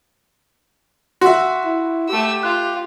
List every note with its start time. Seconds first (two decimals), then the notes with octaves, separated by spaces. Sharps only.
1.21 F#4 E5 F#5 C6
1.65 E4
2.09 A3 G4 E6
2.43 F4 F#6